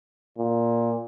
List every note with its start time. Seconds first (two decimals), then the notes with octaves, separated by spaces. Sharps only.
0.38 A#2